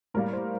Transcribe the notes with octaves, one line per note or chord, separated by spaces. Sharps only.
A2 G3 A#3 A#4
C5